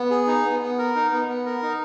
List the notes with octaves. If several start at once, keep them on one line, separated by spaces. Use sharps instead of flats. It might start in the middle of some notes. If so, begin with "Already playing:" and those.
Already playing: B3
G#4
D#4
B3
B3
A#4
D#4
B3
B3
A#4
D#4